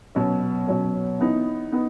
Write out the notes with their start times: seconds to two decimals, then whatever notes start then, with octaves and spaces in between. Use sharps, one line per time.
0.15 B2 F#3 C#4
0.67 B2 F#3 C#4
1.19 E3 B3 D#4
1.72 B3 D#4